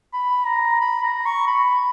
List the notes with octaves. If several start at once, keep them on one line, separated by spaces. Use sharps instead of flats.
B5
A#5
B5
A#5
C#6
B5